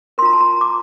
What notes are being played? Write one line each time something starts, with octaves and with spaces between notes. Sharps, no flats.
F4 A#4 A#5 C6
A5
A#5
D6